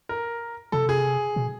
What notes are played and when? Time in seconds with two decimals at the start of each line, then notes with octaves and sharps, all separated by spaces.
0.09 A#4
0.72 C3 A4
0.89 G#4
1.36 B2